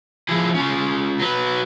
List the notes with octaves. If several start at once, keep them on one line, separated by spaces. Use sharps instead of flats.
F3 E4 G#4
C#4 F4
F#3 B4